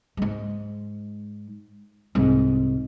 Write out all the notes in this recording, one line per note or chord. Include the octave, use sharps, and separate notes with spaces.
G#2 G#3
C2 G#2